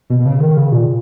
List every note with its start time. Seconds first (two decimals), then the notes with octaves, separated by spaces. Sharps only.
0.10 B2
0.20 B2
0.25 C#3
0.40 D#3
0.57 C#3
0.72 A#2